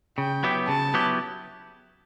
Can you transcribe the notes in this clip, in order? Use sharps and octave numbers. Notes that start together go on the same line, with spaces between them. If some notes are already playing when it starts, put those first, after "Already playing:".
C#3 G5
F#3 B3 E4 G4
C#3 A5
F#3 B3 E4 G4